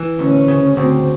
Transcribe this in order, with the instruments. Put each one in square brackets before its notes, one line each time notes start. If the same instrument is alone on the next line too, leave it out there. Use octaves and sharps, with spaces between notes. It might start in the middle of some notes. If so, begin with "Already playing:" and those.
Already playing: [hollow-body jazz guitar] E3
[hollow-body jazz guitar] D2 [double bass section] C#4
[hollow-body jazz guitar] C#3
[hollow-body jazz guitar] D2 [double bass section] C4